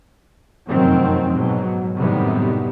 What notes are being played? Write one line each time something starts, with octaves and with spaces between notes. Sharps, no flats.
F1 F#2 D#3 F#3 C4
G#2 B2 F#3
F#2 A2 C3 D#3 G3 B3